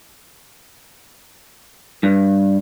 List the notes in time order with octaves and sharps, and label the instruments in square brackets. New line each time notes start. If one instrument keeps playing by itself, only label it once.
[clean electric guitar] G2